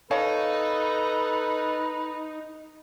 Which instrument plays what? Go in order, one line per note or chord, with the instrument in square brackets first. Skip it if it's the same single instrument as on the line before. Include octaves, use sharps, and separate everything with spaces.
[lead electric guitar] D#4 [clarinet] A4 [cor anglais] B4 [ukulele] C#5 F5 A5